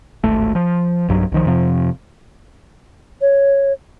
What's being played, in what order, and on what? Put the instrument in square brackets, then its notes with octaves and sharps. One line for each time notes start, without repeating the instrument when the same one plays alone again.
[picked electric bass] D1 G#1 A3
F3
B1 G2 F#3
B1 D#3 F3
F2 C3 F3
[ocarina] C#5